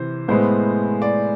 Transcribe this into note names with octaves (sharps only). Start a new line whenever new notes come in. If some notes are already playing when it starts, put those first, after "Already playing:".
Already playing: C3 E3 C5
A2 G#3 B3 C5
D5